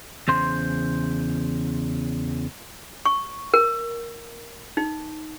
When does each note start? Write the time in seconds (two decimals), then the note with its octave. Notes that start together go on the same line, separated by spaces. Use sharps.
0.28 E2 C#3 C5 C6
3.06 C#6
3.54 A#4
4.77 D#4